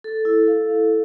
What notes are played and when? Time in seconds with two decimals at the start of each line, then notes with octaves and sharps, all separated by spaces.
0.04 A4
0.25 E4
0.48 F5
0.69 F5